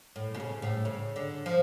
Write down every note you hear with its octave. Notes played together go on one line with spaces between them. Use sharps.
A2
B2
C#3
A2
C#3
D3
F3